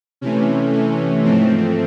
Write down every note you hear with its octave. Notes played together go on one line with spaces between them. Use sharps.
C3 E3 A3 C#4
C#4
G#2 F3 A3 C4